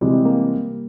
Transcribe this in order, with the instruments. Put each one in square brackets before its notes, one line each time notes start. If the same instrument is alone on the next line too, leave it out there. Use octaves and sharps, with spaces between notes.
[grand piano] C3 E3 G#3 C4 G4 [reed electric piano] G3
[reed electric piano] A#3